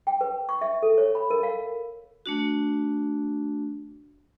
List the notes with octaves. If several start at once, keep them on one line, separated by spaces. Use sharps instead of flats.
G5
B4
C#6
E5
A4
C#5
B5
A#4
F5
A3 D4 F#4